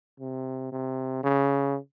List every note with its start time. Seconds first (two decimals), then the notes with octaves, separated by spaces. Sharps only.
0.20 C3
0.72 C3
1.23 C#3